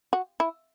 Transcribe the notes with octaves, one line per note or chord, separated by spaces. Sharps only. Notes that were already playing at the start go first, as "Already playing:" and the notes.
F#4
E4